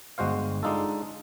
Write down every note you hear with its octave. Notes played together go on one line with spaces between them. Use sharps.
G1 G#3 F#4 C5 F5
G#3 D4 D#4 F4 A4